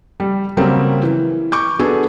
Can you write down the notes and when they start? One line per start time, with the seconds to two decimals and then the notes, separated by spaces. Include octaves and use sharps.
0.20 G3
0.57 C#3 F#3 G3 A#3 C4 C#4
1.03 E3
1.52 C#6 D6 G6
1.79 B3 D4 F#4 G#4 A4